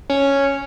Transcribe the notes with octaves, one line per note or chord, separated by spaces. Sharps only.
C#4